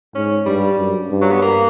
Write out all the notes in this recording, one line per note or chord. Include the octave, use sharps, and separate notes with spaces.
G#2 C#4
G2 G3
F#2
G2
F#3
B3
A#3